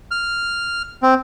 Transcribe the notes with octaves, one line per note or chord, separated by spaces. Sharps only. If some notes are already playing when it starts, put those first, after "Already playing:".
F6
C4